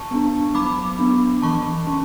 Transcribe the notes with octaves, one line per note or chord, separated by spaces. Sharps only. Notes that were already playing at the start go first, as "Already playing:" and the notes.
Already playing: A5 C#6
B3 D4
F#3 B5 D6
B3 D4
E3 A5 C#6
C#4